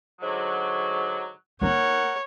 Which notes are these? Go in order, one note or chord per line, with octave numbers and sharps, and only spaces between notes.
G#2 D3 F#3
A#3 D#4 A#4 C#5 F#5